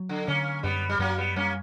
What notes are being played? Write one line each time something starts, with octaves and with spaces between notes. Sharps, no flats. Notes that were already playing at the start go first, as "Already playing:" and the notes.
Already playing: F#3
D3
D3 A#3 C#4
F#2 G3 B3
G3
F#2 F#3 A#3
G3 B3
G3 A#3 C#4